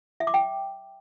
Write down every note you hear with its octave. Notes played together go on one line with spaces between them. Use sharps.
E5
D6
G5